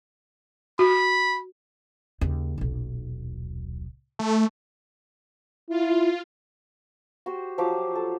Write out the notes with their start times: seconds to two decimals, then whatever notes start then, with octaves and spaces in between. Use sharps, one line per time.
0.79 F#4 B5
2.21 D#2 C#3
2.58 D#1 B1
4.19 A3
5.70 E4 F4
7.26 F#4 G4 C5
7.58 F3 F#3 G4 D6
7.95 A4